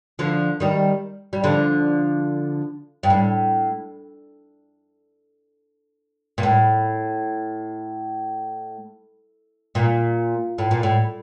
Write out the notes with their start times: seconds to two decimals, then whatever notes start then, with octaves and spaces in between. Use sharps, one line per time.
0.19 D3 F3
0.60 D#3 G3
1.33 G3
1.44 D3 F3
3.03 G2
3.10 A2
6.38 A#2
6.43 A2
9.75 A#2
10.58 A2
10.71 A#2
10.83 A2